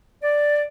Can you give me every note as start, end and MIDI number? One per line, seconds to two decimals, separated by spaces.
0.23 0.63 74